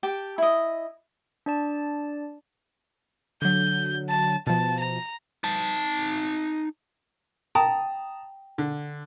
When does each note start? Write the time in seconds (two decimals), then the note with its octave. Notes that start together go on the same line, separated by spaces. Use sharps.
0.03 G4 G5 A5
0.38 E4 D#5
1.46 D4 D5 A5
3.42 D3 F#3 G6
4.09 A5
4.47 B2 F3 A5
4.79 A#5
5.44 D#4 A5
7.55 G5 A5 A#5 D#6
8.58 D3